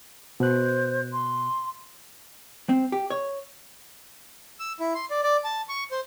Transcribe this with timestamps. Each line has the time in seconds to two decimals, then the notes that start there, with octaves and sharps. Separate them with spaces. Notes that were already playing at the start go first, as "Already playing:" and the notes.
0.40 B2 C5 F#6
1.13 C6
2.69 C4
2.92 G4
3.10 C#5
4.60 E6
4.80 E4
4.95 C6
5.11 D5
5.24 D5
5.44 A5
5.69 C#6
5.92 C5